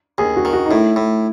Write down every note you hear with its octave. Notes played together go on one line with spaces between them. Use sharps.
D#2 G#4
F#4
D#3
F#4
D#4
A2 E4
A2